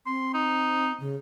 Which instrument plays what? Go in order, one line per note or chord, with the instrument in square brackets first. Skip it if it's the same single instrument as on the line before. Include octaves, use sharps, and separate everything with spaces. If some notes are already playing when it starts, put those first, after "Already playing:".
[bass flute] C4 [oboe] C6
[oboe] D#4
[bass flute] C#3